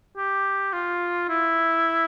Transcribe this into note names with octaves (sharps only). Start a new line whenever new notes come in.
G4
F4
E4